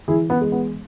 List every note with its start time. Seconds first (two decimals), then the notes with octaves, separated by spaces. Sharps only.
0.08 E3 E4 G#4
0.30 B3
0.41 G#3
0.52 B3